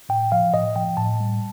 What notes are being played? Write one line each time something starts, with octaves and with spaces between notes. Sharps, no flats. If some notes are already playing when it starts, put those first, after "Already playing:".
A2 G5
F3 F5
A2 D#5
F3 G5
A2 A5
G3